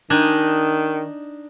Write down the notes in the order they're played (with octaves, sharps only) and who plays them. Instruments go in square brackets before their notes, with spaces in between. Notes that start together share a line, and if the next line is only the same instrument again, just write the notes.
[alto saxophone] D#3 [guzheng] D4 D#4 G#5